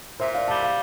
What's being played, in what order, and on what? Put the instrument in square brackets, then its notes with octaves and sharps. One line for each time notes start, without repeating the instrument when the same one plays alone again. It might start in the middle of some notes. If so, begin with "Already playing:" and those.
[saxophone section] A#2 [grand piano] C5 E5
[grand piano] D5 F5
[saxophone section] G3 [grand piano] F5 A5
[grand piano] F5 A5